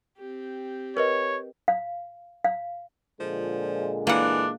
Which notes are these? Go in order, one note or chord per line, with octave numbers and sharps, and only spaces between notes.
C4 G4
A#4 B4 C#5 D#5
F5
F5
A#2 D3 F3 G#3
E3 A#3 D4 F#5